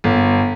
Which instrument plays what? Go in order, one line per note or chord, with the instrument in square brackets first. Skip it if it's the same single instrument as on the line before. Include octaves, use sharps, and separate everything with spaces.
[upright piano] G1